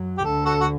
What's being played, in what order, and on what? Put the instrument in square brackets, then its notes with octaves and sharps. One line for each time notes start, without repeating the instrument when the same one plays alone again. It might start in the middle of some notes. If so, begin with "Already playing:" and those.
Already playing: [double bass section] F#2 F#3
[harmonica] G4
[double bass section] D2 D3 [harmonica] A4
[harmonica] F#4 A4
F#4